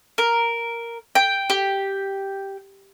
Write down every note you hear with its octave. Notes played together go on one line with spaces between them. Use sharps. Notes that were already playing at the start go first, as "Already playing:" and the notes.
A#4
G5
G4